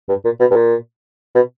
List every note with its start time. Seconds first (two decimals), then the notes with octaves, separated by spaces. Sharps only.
0.09 G2
0.25 A#2
0.40 B2
0.51 G2
0.56 A#2
1.35 B2